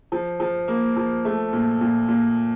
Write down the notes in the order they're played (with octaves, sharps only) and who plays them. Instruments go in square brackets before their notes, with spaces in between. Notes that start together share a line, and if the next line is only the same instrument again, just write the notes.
[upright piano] F3
F3
A#3
F3
A3
A#2
A#2
A#2